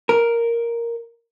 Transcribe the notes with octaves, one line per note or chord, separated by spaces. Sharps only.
A#4